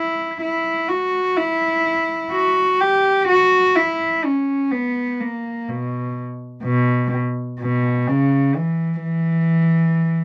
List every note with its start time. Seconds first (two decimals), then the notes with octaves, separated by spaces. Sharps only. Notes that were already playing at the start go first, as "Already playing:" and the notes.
Already playing: E4
0.42 E4
0.89 F#4
1.37 E4
2.32 F#4
2.81 G4
3.28 F#4
3.76 E4
4.25 C#4
4.72 B3
5.21 A#3
5.69 B2
6.64 B2
7.60 B2
8.08 C#3
8.55 E3
9.03 E3